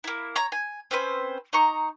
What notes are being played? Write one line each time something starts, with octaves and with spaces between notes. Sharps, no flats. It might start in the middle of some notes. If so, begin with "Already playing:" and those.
A#3 E4
C#5 A#5
G#5
C4 C#4 B4 C5
D#4 A#5 C#6